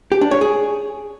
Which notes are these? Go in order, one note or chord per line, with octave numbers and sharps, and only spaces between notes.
G4
D4
C#5
G#4